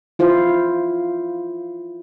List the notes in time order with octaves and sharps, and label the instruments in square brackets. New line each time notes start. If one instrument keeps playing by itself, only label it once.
[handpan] E4 F4 C5